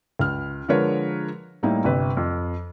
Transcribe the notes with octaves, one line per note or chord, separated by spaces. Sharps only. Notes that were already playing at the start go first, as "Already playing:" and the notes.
C#2 F6
D3 F3 G#3 A#4 B4 C#5
A2 G3 A#3 D#4 E4
G1 C3 B4
F2